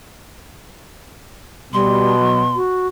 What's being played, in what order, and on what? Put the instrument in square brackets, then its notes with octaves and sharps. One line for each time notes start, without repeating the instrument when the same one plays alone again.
[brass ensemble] B2 [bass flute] G3 [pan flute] C6
[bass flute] F#3
F#4